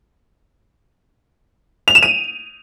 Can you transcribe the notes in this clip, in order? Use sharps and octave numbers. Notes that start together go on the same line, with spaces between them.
F7
E7
D#7